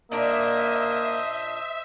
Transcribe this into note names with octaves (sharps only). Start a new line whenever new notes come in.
A#2 A#3 D4 D#4 C5 D#5 E5 D#6